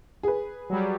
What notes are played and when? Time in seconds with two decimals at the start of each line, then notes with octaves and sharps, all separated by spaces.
0.23 G#4 B4
0.70 F#3 G3